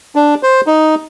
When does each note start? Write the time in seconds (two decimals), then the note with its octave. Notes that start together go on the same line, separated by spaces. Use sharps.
0.16 D4
0.43 C5
0.67 D#4